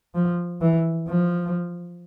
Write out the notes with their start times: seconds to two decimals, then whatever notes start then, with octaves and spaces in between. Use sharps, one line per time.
0.14 F3
0.61 E3
1.08 F3